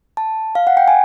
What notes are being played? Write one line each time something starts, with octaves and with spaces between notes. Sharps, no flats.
A5
F5
F#5
G5
G#5